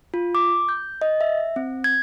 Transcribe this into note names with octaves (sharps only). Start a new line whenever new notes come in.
F4
D6
G6
D#5
E5
C4
G#6